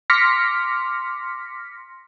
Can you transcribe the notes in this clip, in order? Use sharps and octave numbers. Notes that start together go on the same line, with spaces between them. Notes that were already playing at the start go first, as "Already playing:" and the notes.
C6 D6 F6 A#6 B6 C#7